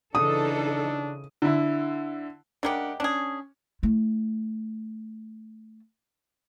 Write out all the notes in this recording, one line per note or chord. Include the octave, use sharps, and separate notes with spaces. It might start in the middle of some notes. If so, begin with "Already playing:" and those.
C#3 E3 D4 D#4 A4 D#6
D3 E4
C#3 G#3 D4 G4 A#4 F#5
C#4 D4 G#4
A3 E4